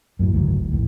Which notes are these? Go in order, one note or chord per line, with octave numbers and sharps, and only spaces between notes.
F#2 A2 F#3
F#1 D2 G#2 F#3
A#1 E2 A2